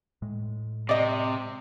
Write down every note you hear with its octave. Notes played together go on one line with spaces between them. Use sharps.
A2 G#3
C3 D5 D#5